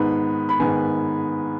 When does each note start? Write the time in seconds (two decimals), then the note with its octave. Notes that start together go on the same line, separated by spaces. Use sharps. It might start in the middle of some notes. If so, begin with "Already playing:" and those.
Already playing: G#2 D#3 B3 B5
0.49 B5
0.60 G#2 D#3 B3 G#5